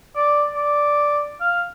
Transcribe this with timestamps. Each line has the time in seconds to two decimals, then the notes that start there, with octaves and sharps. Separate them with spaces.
0.16 D5
0.54 D5
1.41 F5